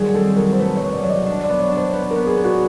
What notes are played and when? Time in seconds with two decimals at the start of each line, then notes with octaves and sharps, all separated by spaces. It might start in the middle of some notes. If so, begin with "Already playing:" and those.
Already playing: D#3 F#3 G3 G#4
0.14 C4 A4
0.36 F#3 A#4
0.53 C5
0.59 A3 B4
0.76 C#5
0.82 F#3
0.92 D5
1.03 F#3 D5
1.09 D#5
1.26 D4 D5
1.44 D5
1.49 B3
1.59 C#5
1.71 D4
1.77 C5
1.93 B3 B4
2.11 B3 A#4
2.27 G#4
2.38 B3
2.44 F#4